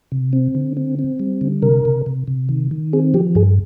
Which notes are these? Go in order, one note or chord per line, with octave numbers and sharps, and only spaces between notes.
C3
C4
D3
C4
C4
G3
D3
C3 A#4
C3
C3
C3
D#3
D#3
C4 G#4
F3 G4
G2 G#4